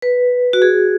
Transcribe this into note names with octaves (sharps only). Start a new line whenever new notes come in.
B4
F#4
G#4